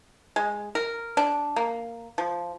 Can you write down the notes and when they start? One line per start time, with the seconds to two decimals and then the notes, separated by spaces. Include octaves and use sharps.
0.36 G#3
0.75 A#4
1.17 D4
1.56 A#3
2.18 F3